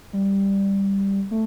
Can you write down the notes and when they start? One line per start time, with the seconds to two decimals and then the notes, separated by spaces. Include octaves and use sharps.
0.13 G3
1.31 A3